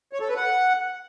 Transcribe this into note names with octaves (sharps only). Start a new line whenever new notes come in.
C#5
A4
B4
F#5